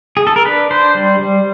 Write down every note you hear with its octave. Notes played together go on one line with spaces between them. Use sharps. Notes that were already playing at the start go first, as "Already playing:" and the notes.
G#4
A4
A#4
D4 B4
D4 C5
G3
G3